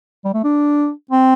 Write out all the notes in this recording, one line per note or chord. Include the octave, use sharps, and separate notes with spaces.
G3
A3
D4
C4